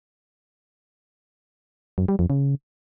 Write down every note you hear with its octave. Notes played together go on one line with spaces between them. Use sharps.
F#2
G3
F2
C#3